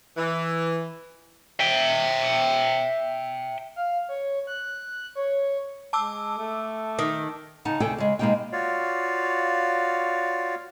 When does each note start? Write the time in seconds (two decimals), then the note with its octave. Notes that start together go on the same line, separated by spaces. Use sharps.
0.18 E3
1.60 E5 G5
3.76 F5
4.09 C#5
4.47 F#6
5.15 C#5
5.93 G#3 A5 D6 E6
6.38 A3
6.99 D#3
7.65 C#3 D#4 F#5 A5
7.80 D2 C3 G#4 A4 G5
7.98 C#3 G#3
8.19 B2 G#3 A#3 D#4 G4 G5
8.52 F4 F#4 C#5 D5 F5